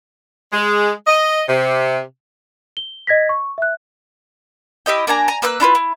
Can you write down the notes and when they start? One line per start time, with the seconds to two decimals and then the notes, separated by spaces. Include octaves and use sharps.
0.52 G#3
1.07 D#5
1.49 C3
2.77 G7
3.07 D#5 G#6 A#6 B6
3.29 C#6
3.58 E5 F#6
4.86 E4 G4 D#5 G5
5.07 A#3 D4 G#5 A#5
5.28 G#5 A#5
5.42 A#3 B4 E6 F#6
5.60 D4 E4 F4 B4
5.75 E4